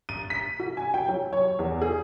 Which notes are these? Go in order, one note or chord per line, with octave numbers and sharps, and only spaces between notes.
D#7
B6
F#4
G#5
G5
F#3
C#5
E2
G#4